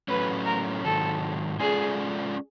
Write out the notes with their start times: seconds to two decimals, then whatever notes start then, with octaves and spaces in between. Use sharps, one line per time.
0.08 A2 F#3 A3 C#4 B4
0.46 A#4
0.84 G#2 D#3 F#3 A4
1.59 G#3 C#4 F4 G#4 A4 D5